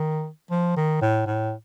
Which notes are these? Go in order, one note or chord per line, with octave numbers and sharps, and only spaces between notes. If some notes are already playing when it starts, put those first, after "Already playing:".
Already playing: D#3
F3
D#3
A2
A2